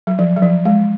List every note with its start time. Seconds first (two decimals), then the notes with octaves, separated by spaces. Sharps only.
0.07 F#3
0.19 F3
0.37 F#3
0.43 F3
0.65 G#3